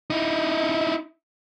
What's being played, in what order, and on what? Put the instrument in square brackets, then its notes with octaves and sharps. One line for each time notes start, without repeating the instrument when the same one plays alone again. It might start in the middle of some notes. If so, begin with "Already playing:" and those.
[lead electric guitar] D#4 E4